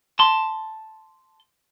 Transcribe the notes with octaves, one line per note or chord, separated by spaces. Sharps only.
A5 C6